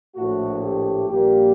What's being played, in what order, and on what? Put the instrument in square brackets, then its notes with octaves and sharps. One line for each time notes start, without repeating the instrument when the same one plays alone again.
[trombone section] A#1 A2 A3 F#4
G4
A#1 A#2 G3 A#3 G4